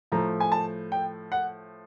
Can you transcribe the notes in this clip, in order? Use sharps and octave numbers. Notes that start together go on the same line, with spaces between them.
A2 F3 A3 A#5
G#5
A5
G5
F#5